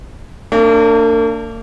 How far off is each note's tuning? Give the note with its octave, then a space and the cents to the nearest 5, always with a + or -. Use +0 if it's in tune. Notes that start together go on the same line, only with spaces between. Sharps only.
A#3 -40 D4 +0